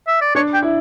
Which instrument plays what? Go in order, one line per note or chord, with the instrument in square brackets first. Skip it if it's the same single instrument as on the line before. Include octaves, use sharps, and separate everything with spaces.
[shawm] E5
D5
[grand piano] D4 [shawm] C#5
[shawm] G5
[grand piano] E4